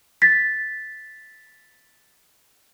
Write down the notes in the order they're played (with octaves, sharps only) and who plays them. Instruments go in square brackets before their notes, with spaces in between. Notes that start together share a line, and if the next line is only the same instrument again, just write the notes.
[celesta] A6 B6